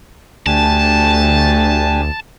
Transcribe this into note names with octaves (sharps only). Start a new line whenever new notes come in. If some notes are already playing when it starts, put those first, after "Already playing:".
D2 A3 D4 G4 G#5 A5